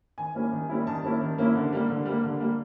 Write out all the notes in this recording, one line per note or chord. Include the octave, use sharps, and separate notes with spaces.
D#3 G#5
G3 A#3 C#4 E4
D#3
G3 A#3 C#4 E4
D#3 A5
G3 A#3 C#4 E4
D#3
G3 A#3 C#4 E4
D3
G3 A#3
D3
G3 A#3
D3
G3 A#3